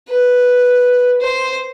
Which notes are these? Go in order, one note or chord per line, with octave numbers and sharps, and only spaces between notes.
B4
C5